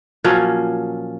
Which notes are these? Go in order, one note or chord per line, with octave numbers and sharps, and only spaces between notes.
A#2 F3 F#3 C#4